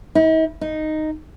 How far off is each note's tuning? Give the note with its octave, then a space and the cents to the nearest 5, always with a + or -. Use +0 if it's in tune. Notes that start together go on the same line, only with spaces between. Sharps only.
D#4 +45
D#4 -5